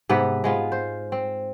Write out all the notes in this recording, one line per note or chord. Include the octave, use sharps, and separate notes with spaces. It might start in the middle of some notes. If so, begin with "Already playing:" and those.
G#2 C3 B3 B4
G#3 B3 F4
C5
C4